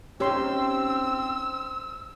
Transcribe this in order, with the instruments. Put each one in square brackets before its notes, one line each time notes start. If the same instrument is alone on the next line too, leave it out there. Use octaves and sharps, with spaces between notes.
[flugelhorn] C4 [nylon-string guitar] C#4 D#4 [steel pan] G4 C#5 C6 [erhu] E6